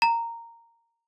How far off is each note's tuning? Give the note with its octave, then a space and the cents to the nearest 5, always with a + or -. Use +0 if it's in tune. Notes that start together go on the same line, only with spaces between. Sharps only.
A#5 -10